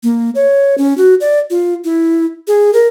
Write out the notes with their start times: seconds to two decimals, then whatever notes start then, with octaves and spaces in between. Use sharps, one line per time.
0.03 A#3
0.35 C#5
0.78 C#4
0.98 F#4
1.21 D5
1.50 F4
1.84 E4
2.48 G#4
2.73 A#4